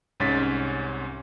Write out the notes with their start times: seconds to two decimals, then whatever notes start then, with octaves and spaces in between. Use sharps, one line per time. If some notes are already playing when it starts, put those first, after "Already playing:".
0.20 C2 G#2 C#4 A6 B6